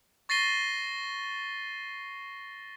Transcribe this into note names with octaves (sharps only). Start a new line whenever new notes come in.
C#6 A6 A#6 C7 D#7 G7